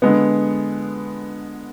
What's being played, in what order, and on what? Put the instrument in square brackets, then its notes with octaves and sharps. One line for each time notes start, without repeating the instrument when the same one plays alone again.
[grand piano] D3 G#3 B3